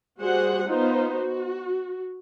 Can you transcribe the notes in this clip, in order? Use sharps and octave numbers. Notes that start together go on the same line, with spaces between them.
G3 F#4 G#4 C5 F#5
B3 D#4 F4 C5
F#4